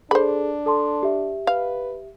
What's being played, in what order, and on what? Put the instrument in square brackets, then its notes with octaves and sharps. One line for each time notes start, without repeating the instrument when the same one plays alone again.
[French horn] D4 [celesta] G#4 A4 [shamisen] C5 B5
[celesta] A4 A5 C6
G4 E5
[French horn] B4 [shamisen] F5